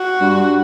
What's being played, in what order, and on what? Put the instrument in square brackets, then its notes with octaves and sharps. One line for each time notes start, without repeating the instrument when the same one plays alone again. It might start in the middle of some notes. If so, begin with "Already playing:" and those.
Already playing: [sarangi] F#4
[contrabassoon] G2